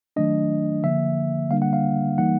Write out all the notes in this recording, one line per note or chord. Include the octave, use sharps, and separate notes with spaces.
D#3 F#3 A3 D4 D#5
D3 F3 A#3 E5
D3 G3 A#3 D4 F5
F#5
F5
E3 G3 A#3 D#4 F#5